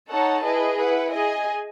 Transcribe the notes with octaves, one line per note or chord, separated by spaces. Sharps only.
D#4 A4 C#5 F#5 A5
E4 G#4 B4 D#5
E4 B4 F#5
G#4 D#5 G#5